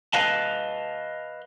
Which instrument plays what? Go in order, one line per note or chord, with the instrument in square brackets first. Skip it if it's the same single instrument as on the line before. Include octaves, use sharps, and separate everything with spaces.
[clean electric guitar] B4 D#5 F5 A5